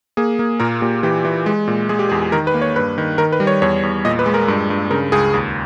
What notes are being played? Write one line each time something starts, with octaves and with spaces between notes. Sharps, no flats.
A#3 G#4
A#3
A#2 A#4
A#2 G4
E3 G4
E3
G#3
A#2
G#3 G#4
G4
E2 G#4
D#3 A#4
B4
A#3
C#5
G2 B4
D#3
D#3 A#4
B4
G3
C#5
E2 C#5
E2
A#2 D#5
B4
G#3
A#4
G2
G2
C#3 A#4
C#2 G#4
D#2